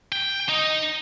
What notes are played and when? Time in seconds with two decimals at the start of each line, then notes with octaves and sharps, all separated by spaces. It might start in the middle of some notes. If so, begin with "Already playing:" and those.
0.12 G5
0.49 D#4